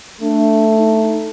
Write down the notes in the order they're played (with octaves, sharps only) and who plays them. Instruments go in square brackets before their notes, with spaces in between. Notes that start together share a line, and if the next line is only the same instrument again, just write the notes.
[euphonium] A3 [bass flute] D4
[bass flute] D#4